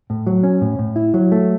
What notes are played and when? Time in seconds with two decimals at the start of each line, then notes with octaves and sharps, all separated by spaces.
0.10 A2
0.27 F#3
0.43 C#4
0.61 A2
0.79 A2
0.96 E4
1.14 F#3
1.32 A3